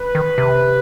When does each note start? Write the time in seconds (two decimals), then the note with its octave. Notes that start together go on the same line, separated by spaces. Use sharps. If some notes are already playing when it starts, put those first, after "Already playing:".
Already playing: B4
0.15 D#3
0.38 C3